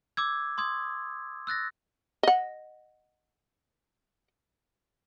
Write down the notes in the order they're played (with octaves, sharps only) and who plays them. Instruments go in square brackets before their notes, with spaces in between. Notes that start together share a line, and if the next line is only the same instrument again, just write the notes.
[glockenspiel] D6 E6 G#6
C6 D#6 G#6
E6 F#6 A6 A#6
[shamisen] D#5 F#5